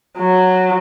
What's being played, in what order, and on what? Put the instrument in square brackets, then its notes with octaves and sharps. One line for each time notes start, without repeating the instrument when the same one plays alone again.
[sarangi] F#3